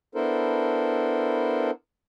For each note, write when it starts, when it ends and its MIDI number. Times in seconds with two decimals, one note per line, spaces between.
0.15 1.71 59
0.15 1.71 62
0.15 1.71 64
0.15 1.71 69
0.15 1.71 70
0.15 1.71 72